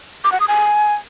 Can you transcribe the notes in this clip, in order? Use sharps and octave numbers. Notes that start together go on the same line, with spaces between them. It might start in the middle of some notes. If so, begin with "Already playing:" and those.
D6
F#5
D#6
G#5